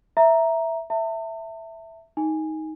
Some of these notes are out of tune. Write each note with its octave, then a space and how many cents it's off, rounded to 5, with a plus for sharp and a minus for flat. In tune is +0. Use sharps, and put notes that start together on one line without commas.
E5 +0 A#5 +0
E5 +0 A5 +45
D#4 +15 G#5 -5